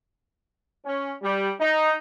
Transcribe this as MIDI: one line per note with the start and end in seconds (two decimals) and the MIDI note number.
0.85 1.11 61
1.22 1.50 55
1.60 1.91 63